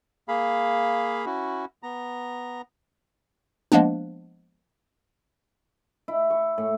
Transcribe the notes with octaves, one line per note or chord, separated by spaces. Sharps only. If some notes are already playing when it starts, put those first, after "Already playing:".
A#3 G#4 F5 B5
C#4 E4 F#4
B3 A#5
F3 G#3 A#3 B3 D4
E4
C#6
A2